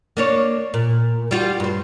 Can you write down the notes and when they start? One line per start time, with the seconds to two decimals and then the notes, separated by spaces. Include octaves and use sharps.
0.17 A#3 D4 C#5
0.74 A#2
1.31 G3 F4 F#4
1.60 G2 C5